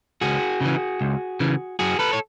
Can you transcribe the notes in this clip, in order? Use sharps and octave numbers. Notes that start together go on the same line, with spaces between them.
C#2 F#4 G#4
C#3 E3
C#2
C#3 E3
F#2 F#4 G#4
A4 B4
C#5